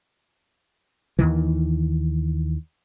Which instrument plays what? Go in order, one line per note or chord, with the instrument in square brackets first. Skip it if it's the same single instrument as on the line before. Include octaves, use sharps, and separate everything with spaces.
[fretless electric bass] D#2 C3 D#3 E3